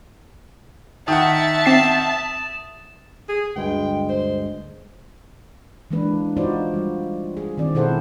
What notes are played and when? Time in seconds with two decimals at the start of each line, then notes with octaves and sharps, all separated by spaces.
1.08 D#3 E5 F#5 A5 D#6
1.66 C4 A6 C7 E7
3.29 G#4
3.56 D2 G2 G#3 G5
4.09 C5
5.91 E3 G#3 A#3 D4 B4
6.37 D#4 F4 F#4 C5 D5
6.74 G3
7.37 G#4
7.57 D#3 C4 D5
7.74 B2 E4 G#4 A4 C5 F#5